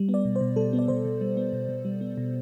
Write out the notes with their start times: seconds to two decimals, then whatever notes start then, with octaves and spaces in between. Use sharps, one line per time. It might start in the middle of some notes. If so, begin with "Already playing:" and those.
Already playing: G3
0.09 B3
0.14 D5
0.25 B2
0.36 C5
0.41 B2
0.56 G3 A4
0.73 B3
0.79 D5
0.88 B2 C5
1.05 B2
1.21 G3
1.37 B3
1.53 B2
1.69 B2
1.85 G3
2.01 B3
2.18 B2